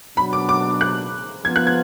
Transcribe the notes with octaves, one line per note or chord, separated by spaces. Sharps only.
B2 F#3 D4 B5
D6
D6
F#6
F3 B3 F4 G#6
F#6
G#6